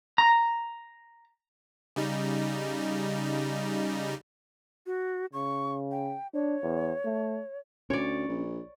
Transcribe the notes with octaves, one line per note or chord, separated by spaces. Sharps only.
A#5
C#3 G3 D#4
F#4
C#3 C#6
G5
D4 C#5
E2
A3
D2 C#4 C#5 D5
A#1